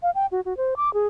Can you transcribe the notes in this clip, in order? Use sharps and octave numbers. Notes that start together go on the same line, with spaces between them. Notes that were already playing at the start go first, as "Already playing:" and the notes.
F5
G5
F#4
F#4
C5
D6
G#4